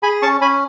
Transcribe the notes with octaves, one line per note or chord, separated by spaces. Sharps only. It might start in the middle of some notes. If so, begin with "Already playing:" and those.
G#4 G#5 B5
C#4 A5 C#6
C#4 G#5 B5